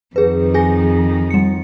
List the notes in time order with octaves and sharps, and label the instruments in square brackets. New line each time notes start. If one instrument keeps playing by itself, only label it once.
[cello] F2 D#3 [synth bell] G#4 B4
[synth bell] G#4 G#5 A#6
G3 C#7